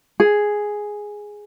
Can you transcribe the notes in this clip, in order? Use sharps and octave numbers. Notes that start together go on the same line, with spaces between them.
G#4